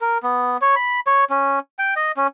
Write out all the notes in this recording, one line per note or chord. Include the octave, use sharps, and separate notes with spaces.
A#4
B3
C#5
B5
C#5
C#4
G5
D#5
C#4